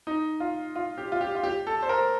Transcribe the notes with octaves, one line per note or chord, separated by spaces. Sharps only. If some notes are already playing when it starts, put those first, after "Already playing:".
D#4
F4
F4
G4
F4
G4
F4
G4
A4
C5
A#4